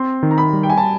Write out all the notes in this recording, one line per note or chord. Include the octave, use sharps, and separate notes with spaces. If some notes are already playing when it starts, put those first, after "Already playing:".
Already playing: C4 C6
D#3
A#5
B5
G3
G5
G#5
A5